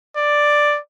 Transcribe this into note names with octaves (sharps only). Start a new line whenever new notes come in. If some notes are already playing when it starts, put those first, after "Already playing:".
D5